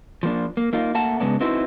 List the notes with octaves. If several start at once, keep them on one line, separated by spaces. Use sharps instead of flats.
F3 A#3 D4
A#3
A#3 D#4 F4
A3 A#3 F#5 A5
C#3 G#3 B3 D4
C4 D#4 E4 F#4 B4 C5